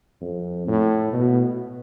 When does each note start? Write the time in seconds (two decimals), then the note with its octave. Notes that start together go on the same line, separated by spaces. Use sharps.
0.21 F2
0.67 A2
1.13 B2